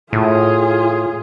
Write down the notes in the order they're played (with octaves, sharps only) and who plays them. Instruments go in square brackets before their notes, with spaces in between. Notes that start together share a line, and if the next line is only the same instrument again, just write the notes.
[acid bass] A2 [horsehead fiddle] F4 G#4